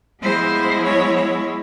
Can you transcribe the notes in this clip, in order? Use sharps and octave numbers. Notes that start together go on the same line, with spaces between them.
F3 G#3 B3 E4 C5
C#5
C#5